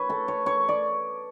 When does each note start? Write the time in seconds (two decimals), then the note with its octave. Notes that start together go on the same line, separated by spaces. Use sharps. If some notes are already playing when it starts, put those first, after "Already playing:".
Already playing: B4 C#5
0.10 A4
0.28 C#5
0.46 C#5
0.69 D5